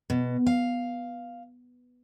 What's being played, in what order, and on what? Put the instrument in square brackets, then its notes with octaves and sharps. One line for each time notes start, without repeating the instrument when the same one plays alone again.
[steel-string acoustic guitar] B2
F5